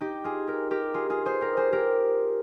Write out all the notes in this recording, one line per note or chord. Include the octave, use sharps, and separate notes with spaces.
D#4 G4
F4 G#4
G4 A#4
G4 A#4
F4 G#4
F4 G#4
G#4 C5
G4 A#4
G#4 C5
G4 A#4